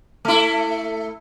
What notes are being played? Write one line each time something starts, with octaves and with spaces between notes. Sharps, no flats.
A3 E4